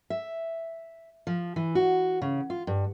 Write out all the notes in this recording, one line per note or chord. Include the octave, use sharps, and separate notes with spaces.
E5
F3
E3
F#4
C#3
F4
G2